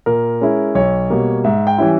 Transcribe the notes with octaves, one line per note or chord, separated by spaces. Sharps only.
A#2 A#4
G#3 C#4 E4
B1 C#5
B2 G3 A#3
G#2 E5
G5
E3 G3 C#4 E4